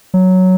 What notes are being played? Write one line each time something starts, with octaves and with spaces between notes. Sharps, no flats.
F#3